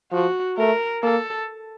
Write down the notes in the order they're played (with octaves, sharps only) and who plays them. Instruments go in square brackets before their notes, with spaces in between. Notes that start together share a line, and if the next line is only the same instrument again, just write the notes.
[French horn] F3 [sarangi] F#4
[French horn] A3 [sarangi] A#4
[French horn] A#3 [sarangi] A4